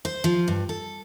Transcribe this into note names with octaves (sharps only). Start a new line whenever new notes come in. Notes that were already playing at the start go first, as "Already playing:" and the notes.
C5
F3
G2
A4